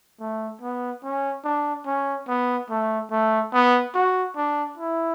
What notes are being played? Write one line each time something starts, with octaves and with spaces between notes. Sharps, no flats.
A3
B3
C#4
D4
C#4
B3
A3
A3
B3
F#4
D4
E4